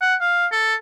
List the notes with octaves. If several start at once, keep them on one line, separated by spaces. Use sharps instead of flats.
F#5
F5
A4